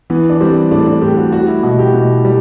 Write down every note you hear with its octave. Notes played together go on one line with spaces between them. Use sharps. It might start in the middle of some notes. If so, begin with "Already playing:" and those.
E3 B3
D4
G3 C4
A2 D4
D4
A2 G4
F#4
G3 F#4
E4
B2 F#4
G4
B2
G3